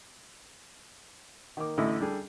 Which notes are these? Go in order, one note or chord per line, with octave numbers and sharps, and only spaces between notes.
D#3 A#3 D6
A1 A2 D3 E4 A4 D#5
G3 D4 G#4 A4